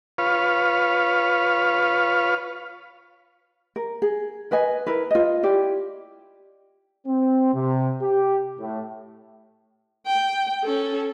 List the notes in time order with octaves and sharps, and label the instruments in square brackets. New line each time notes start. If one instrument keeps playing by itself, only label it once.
[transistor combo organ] F4 B4 C#5 F5
[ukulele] A#4
G#4
A#4 B4 D#5 G#5
E4 A#4 B4
F4 D#5
E4 G4 D5
[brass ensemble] C4
C3
G4
A2
[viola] G5
C#4 A4